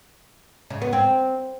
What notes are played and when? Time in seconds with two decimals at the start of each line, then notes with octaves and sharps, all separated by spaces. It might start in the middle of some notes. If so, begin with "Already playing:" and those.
0.70 C#3
0.82 B3
0.93 C4